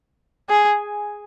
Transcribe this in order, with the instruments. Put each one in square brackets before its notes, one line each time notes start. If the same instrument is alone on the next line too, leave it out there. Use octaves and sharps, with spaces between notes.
[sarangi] G#4